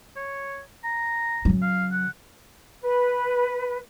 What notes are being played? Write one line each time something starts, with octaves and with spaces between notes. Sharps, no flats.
C#5
A#5
C#3 F#3
F5
F#5
B4